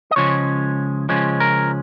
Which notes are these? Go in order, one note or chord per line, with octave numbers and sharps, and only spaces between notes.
D#5
C#2 C#3 F3 G#3 C#4 C#5
C#2 C#3 F3 G#3 C#4
A#4